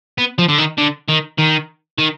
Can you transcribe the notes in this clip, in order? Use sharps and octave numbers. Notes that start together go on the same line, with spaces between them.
B3
F3
D3
D#3
D3
D#3
D#3
D#3